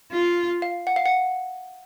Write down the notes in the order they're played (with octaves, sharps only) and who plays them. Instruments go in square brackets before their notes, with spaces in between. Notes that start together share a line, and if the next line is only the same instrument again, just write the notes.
[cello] F4
[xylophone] F5
F#5
F5
F#5